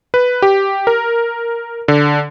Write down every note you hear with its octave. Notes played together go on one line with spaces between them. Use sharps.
B4
G4
A#4
D3